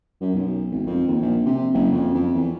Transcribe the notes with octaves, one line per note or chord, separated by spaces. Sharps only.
F#2
B1
G#1
F2
D#2
A#1
C3
F#1
F2
F2
E2